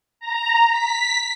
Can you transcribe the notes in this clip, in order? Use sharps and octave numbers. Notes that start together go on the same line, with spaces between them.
A#5
B6